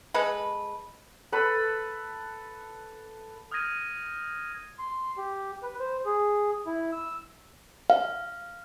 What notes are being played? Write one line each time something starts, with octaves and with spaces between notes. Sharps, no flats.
G#3 A4 B4
A4 B4 B5 E6
D#6 F6 G6 G#6 A#6 D#7
C6
G4
B4
C5
G#4
E4
E6
F5